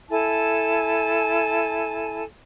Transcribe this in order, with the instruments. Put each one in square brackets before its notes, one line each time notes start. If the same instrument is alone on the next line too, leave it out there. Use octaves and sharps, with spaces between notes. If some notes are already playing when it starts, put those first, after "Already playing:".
[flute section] E4 A4 G#5 A5